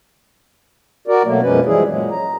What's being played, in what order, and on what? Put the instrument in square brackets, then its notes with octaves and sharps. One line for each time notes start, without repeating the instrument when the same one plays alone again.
[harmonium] F#4 A#4 D5
B2 F#3 A3 A#3
F#2 B2 F3 G#3 C#4 B4
E3 F3 G3 G#3 E4 G#4
A#2 F#3 G#3
A#5